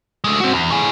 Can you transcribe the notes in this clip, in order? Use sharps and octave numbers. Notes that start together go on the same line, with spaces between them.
G#3 A3
C4 F#4
E2
A2 G#4